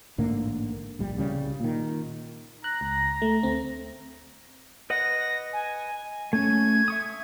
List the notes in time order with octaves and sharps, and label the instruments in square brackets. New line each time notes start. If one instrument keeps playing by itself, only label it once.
[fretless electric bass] A1 G#2 D3 A#3
D1 A#1 G3
C2 C#3 G3
A#2 D#3
[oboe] A#5 [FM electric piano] F#6
[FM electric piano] C#2
A3
D2 C4
[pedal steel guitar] B4 D#5 F#5 [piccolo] A#6
[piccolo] G#5
[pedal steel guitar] A3 C#4 [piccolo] G#6
[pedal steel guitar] E5 C#6 D#6